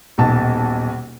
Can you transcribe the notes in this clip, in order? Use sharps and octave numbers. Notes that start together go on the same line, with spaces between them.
D#1 B1 A5